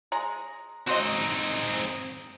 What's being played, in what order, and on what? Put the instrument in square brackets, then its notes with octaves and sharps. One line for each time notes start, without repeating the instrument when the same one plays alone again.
[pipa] G#3 A#5
[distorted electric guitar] C4 D#4 [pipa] F#4 C5 D#5